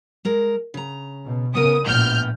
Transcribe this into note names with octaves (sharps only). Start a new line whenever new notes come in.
G#3 A#4
C#3 A#5
B2
C#3 B3 A#4 D#6
A#1 A2 B3 F6 G6